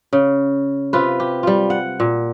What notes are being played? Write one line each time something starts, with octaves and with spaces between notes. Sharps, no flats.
C#3
C3 F4 B4
G4
G3 F4
F#5
A#2